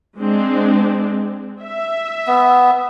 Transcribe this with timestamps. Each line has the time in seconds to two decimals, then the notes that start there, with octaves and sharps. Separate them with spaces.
0.16 G#3 C4 D4
1.61 E5
2.27 B3